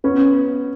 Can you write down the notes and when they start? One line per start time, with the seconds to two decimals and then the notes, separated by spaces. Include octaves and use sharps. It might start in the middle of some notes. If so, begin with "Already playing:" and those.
0.04 B3 C#4